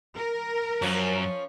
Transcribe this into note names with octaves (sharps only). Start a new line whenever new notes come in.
A#4
F#2 F3 C#4